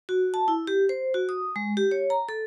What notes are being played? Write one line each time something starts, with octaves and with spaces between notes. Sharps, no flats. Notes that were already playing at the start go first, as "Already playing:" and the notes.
F#4
A5
E4
G4
C5
F#4
D#6
G#3
G4
C#5
A#5
A4